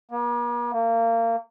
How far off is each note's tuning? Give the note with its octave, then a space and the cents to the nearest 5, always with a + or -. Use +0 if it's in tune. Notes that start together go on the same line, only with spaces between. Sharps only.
A#3 +45
A#3 -30